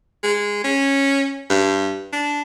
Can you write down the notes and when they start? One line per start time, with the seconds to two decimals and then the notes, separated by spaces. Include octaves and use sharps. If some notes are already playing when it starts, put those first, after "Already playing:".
0.23 G#3
0.64 C#4
1.49 G2
2.13 D4